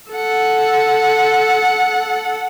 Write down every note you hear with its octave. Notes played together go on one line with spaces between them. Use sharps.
A4 F#5